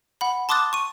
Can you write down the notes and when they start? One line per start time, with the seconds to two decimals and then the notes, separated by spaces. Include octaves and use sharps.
0.21 F#5 B5
0.49 A5 C6 D6 D#6 F#6 A6
0.73 C#6 D#7